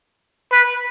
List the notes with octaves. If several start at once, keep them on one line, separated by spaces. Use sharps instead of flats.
B4